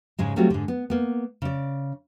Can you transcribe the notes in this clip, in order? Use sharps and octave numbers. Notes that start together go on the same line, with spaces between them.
G#2 C#3 G#3
F#3 G3 A3 C4 F4 F#4
G#2 D3
B3
A#3 B3
C#3 D5